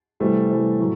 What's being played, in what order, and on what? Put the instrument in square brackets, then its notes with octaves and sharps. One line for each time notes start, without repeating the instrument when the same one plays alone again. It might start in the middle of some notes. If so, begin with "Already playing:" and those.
[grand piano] C3 E3 G3 A3
C3 E3 G3
A2 F#3